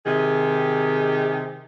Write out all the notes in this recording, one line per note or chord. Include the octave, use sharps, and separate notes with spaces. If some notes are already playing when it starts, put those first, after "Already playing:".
C3 D#3 G4 G#4